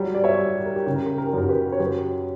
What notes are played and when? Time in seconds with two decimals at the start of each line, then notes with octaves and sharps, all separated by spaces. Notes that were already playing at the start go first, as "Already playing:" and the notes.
Already playing: F#3 G3
0.15 D5
0.24 C#5 E5
0.39 G3
0.55 G4
0.65 A#4
0.76 G4
0.86 C#3 G4
0.96 A#4
1.06 G4
1.18 A#4
1.27 G4
1.33 F#2 F#4 A#4
1.49 G4 B4
1.72 C#5
1.80 F#3 G4 B4